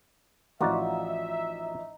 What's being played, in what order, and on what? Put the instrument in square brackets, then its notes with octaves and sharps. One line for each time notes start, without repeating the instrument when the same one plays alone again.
[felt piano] A1 F3 [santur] D#4 [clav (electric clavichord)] F4 F#4 D5 [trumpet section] E5